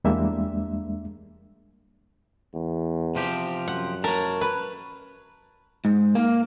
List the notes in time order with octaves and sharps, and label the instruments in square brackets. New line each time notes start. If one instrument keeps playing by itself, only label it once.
[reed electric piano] E2 G3 G#3 A#3 D4 E5
[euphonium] E2
[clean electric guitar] C3 F3 G4
[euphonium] F#2 [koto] F#5
[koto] A#4 [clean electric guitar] C#5 A5
[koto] B4
[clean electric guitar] G#2
A#3